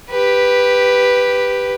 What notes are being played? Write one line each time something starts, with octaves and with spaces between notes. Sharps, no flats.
G4 B4